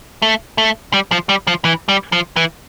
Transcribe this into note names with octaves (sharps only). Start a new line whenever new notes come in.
A3
A3
G3
F3
G3
F3
E3
G3
F3
E3